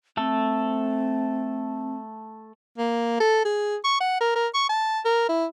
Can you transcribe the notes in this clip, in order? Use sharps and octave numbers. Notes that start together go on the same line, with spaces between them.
A3 C4 A4
A#3
A4
G#4
C#6
F#5
A#4
A#4
C#6
A5
A#4
E4